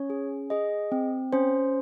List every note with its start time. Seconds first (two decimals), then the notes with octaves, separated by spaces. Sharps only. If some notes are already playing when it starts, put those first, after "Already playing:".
Already playing: C#4 C#5
0.10 G#4
0.50 G#4 D#5
0.92 C4
1.33 C#4 C5